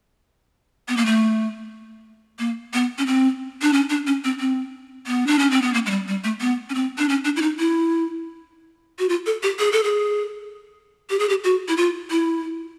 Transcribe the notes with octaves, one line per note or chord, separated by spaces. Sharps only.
B3
A#3
A3
A#3
B3
C#4
C4
D4
C#4
D4
C#4
C4
C4
B3
D4
C#4
C4
B3
A#3
G#3
G3
G3
A3
B3
C#4
C4
D4
C#4
D4
E4
D#4
E4
F#4
F4
A4
G4
G#4
A4
G#4
G4
G#4
G4
F#4
E4
F4
E4